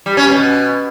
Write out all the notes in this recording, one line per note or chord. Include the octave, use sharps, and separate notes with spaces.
G3
C#4
B2